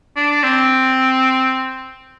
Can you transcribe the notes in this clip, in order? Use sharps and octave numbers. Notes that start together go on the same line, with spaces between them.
D4
C4